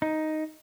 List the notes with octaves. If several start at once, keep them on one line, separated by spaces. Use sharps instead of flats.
D#4